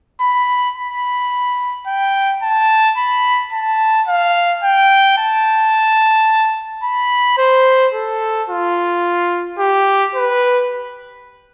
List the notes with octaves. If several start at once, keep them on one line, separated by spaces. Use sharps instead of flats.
B5
B5
G5
A5
B5
A5
F5
G5
A5
B5
C5
A4
F4
G4
B4